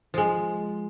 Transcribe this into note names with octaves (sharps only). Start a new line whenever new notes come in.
F3 G#3